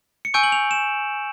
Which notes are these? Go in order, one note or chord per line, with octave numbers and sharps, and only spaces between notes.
C#7
G#5 C#6 E6 G6 D7
F#7
F7
E7